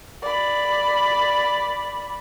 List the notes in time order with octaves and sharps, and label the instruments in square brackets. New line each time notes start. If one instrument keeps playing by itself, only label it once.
[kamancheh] D5 B5